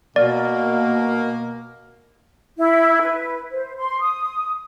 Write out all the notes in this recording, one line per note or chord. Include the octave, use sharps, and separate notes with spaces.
B2 A#3 D5
E4
B4
C5
C6
D#6